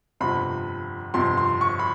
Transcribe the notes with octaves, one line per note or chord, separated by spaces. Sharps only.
G1 F2 C3 B5
G1 F2 C3 C6
C6
C#6
B5